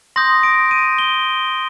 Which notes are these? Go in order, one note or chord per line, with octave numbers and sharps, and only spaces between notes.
C6 D#6 G6 A#6
D7
D#7
G7